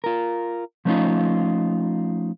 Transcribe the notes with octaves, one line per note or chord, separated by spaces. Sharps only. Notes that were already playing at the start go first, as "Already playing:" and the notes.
F4 A#4
F3 A3 B3 C#4 D#4 F4